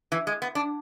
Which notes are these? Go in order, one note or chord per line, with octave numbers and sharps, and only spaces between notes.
E3
G#3
B3
D4